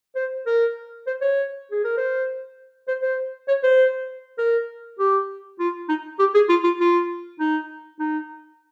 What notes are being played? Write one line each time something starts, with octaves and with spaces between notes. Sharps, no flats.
C5
A#4
C5
C#5
G#4
A#4
C5
C5
C5
C#5
C5
A#4
G4
F4
D#4
G4
G#4
F4
F4
F4
D#4
D#4